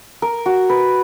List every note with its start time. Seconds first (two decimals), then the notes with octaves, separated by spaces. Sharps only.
0.22 A#4
0.46 F#4
0.69 B4